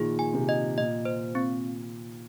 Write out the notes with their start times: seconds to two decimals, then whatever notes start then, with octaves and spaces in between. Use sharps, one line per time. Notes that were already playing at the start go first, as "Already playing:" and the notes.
Already playing: A#2 D#3 F3 G#4
0.19 G#5
0.34 C3
0.49 D#5
0.78 A#2 D#5
1.05 C5
1.35 C4